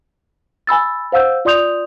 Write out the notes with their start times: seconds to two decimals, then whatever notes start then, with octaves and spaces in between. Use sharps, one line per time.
0.67 G#5 B5 E6 A6
1.12 C5 F5 F#5 E6 G6
1.45 F4 D5 C6 D#6 G6 F7